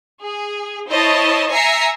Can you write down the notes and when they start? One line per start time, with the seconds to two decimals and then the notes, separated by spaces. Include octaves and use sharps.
0.20 G#4
0.88 E4 C5 C#5 D#5 A5
1.51 E5 G#5 A#5 A#6 C7 C#7